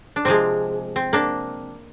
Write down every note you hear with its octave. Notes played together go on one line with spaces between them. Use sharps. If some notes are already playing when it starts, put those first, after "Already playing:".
D4
C3 F3 G#3 C4
C4
A#3 D4